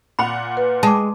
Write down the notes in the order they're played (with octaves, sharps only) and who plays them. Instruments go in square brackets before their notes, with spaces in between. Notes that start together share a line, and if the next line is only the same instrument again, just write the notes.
[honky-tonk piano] A#2 F#5 [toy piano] B5
[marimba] B4
[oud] G#3 [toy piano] A5 D6